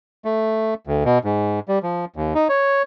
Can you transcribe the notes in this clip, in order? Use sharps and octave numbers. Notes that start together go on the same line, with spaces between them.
A3
D2
B2
G#2
G3
F3
D#2
D#4
C#5